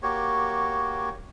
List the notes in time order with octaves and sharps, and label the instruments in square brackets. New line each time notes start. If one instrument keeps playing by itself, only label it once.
[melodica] A#3 F#4 G4 C#5